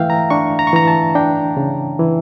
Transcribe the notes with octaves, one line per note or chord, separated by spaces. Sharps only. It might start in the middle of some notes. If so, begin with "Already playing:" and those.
Already playing: E3 A3 E5 F5 G5
A#5
D4 C#6
A#5
C#6
E3 A#5
A5
D4 G5
C#3
E3